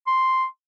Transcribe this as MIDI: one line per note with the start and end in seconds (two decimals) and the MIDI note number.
0.07 0.45 84